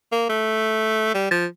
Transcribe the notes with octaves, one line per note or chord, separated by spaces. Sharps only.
A#3
A3
G3
F3